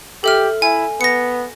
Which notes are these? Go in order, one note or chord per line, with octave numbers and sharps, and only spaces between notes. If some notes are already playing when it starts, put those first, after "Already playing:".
G4 A4 E5 F6
E4 G#5
B3 A#6 C#7